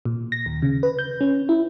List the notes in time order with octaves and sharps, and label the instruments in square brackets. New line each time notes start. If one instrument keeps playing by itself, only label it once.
[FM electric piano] A#2
A#6
D#2
C#3
B4
G6
C#4
E4